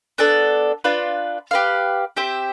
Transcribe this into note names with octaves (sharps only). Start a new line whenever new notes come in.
B3 D4 A4 D5
D4 F4 B4
G4 B4 F5
C4 G4 C5 E5